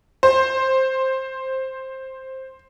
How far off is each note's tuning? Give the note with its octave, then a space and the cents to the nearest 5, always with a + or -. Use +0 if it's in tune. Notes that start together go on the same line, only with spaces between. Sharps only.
C5 +10